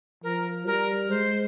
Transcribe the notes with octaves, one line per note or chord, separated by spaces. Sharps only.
F3 A#4
G3 A#4
G#3 C5